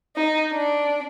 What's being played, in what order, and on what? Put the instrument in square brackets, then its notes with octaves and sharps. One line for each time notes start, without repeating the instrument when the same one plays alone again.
[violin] D#4
D4